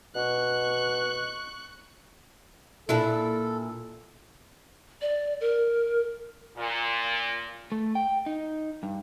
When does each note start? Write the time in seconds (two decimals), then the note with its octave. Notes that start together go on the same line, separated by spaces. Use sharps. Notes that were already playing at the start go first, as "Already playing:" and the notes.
0.15 B2 C#6 F#6
2.89 A#2 D4 E4 A4
5.01 D5
5.40 A#4
6.57 A#2
7.72 A3
7.95 G5
8.26 D#4
8.83 G2